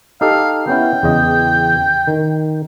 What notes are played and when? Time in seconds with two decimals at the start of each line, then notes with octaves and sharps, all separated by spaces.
0.21 D#4 G4 A4 F5
0.67 B3 C#4 E4 G5
1.03 E2 C#3 D#5
2.07 D#3